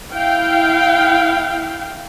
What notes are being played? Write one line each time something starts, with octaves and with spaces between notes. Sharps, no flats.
E4 F5 G5